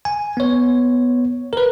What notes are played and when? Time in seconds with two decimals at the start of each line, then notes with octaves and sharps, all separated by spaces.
0.05 G#5
0.37 B3 C#5
1.53 A#4 B4